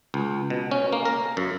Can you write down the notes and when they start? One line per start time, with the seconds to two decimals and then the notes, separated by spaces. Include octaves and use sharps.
0.14 C#2
0.50 B2
0.71 C#4
0.93 A#3
1.05 A#4
1.37 F#2